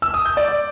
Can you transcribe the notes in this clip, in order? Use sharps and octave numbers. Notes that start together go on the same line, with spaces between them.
E6
D#6
G6
D5